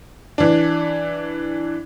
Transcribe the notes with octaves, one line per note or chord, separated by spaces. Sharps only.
E3 D4